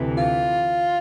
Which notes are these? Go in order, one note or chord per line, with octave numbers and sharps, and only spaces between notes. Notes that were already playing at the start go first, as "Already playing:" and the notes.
Already playing: D2 C3 E3
F4